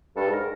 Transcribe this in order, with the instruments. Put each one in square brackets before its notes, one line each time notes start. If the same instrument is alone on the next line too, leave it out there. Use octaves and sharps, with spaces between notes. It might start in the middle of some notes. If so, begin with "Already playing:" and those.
[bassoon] G2 [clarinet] A4
[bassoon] G#2 [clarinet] A#4